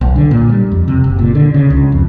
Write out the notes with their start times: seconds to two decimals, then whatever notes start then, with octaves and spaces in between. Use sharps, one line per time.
0.01 B1
0.16 D3
0.31 A#2
0.49 G3
0.72 F2
0.88 C3
1.04 F#1
1.19 A#2
1.35 D3
1.54 C#3
1.70 C#2
1.92 F2